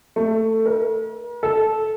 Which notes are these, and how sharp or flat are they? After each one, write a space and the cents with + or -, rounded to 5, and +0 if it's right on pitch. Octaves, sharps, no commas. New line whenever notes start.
A3 +15
A#4 +45
A4 -15